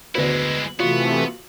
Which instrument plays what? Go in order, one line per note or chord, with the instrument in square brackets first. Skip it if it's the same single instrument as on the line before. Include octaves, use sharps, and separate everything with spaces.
[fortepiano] D2 B3 [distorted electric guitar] G#3 E4
[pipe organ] C3 E3 A3 [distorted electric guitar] B3 [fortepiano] F4 F#4